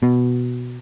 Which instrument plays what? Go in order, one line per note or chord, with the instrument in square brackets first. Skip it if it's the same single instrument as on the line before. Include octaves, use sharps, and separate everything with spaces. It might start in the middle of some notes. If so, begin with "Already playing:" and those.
[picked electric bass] B2